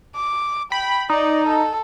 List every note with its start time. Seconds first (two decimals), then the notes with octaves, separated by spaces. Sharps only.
0.15 D6
0.72 G5 B5
1.10 D#4 D5
1.47 A4